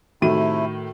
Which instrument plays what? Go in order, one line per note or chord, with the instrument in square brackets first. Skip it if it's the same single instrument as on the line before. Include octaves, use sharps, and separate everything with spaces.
[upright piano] A2 D#3 D#7 [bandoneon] C3 A3 E4 [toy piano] F#4